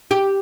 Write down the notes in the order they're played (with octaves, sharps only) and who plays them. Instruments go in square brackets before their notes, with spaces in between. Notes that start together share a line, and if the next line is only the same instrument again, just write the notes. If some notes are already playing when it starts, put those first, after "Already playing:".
[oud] G4